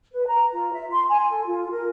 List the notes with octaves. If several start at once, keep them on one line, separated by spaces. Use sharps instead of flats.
B4
A#5
F4
E5
C6
G#5
A4
F4
A#4